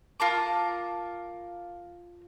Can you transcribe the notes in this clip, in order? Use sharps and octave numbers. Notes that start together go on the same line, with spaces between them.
F4 A#4 A5 D6